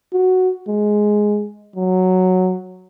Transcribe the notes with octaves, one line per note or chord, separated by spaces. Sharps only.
F#4
G#3
F#3